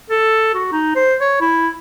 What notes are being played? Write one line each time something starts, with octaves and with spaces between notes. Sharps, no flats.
A4
F#4
D#4
C5
C#5
E4